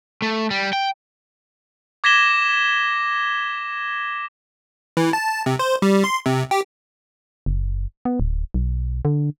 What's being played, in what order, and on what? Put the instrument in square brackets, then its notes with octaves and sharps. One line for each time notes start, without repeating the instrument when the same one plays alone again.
[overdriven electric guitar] A3
G3
G5
[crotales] D6 G#6 A#6 B6 E7 G7
[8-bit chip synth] E3
A5
C3
C5
G3
C6
C3
G4
[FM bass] F#1
B3
D1
B1
D3